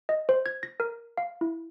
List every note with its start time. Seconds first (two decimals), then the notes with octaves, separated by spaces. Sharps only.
0.09 D#5
0.29 C5
0.46 G#6
0.63 A#6
0.80 A#4
1.18 F5
1.41 E4